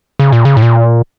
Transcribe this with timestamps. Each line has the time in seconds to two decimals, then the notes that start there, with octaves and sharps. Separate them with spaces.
0.19 C#3
0.32 A#2
0.45 C#3
0.57 A2
0.62 A#2